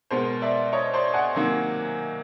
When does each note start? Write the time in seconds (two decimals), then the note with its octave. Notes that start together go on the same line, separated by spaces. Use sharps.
0.11 B2 G#3 B3 A#4 C5
0.42 D5 E5
0.73 C#5 D#5
0.94 C5 D5
1.14 F#5 G#5
1.35 C3 D#3 F#3 A#3